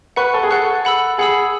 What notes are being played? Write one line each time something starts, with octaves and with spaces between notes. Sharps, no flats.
B4 F#5 C#6 F#6
A4
G#4
A4 F#5 C#6 F#6
F#5 B5 E6
G#4 F#5 B5 E6